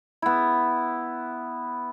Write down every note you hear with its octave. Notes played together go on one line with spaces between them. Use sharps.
B3 E4